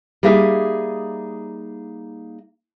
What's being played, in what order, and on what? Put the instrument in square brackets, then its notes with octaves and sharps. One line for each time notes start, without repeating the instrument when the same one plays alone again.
[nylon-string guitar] G3 A#3 D#4 G#4 E5 F5